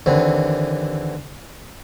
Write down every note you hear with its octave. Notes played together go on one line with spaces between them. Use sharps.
D#2 D3 E3 C4